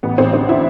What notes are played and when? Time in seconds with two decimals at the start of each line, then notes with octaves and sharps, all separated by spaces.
0.03 A1 B3
0.18 A1 C4
0.33 D3 C4
0.49 D3 E4